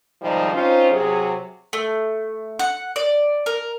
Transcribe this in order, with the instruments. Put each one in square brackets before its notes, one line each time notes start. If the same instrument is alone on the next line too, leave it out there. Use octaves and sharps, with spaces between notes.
[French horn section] G#2 C3 D#3 F3 G3 D#4
C4 C#4 D#4 F4 C5
C3 F#3 G#4
[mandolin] A3
F#5
D5
A#4